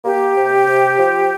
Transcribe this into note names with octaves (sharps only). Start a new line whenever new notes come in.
A#3 G4
C3
C3
F3